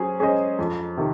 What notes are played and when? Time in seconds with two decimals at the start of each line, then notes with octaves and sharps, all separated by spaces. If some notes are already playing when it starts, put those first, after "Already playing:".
Already playing: F#3 C#4 G#4 C5
0.20 C#4 G#4 C5 D#5
0.59 F2
0.97 C3 D#3